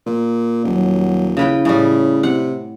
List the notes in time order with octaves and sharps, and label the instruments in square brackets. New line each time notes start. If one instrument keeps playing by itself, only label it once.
[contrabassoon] A#2
[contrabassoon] D#1 [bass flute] F#3
[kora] C#3 B4 G5 [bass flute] E4
[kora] A2 G3 [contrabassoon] C#3
[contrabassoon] C3 [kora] F#5